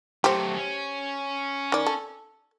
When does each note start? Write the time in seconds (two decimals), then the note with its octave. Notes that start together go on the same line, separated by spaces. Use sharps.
0.24 F#3 A3 G4 C5
0.55 C#4
1.72 D#3 D5
1.86 A4